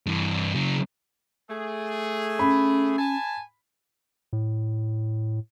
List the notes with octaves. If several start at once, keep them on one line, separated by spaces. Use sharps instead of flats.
G2 E3
C#3 F#3
A3 G#4
C#4 B5
G#5 A5
A2